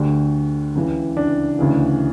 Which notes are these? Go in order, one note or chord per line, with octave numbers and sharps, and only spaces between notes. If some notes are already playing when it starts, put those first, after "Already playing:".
Already playing: D2 D3 G4
C#2 C#3 E3
D4
D2 C#3 E3